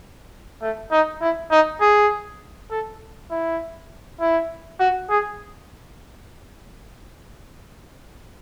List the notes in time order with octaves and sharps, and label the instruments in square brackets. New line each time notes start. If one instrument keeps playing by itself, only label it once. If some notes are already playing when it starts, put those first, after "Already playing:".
[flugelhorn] A3
D#4
E4
D#4
G#4
A4
E4
E4
F#4
G#4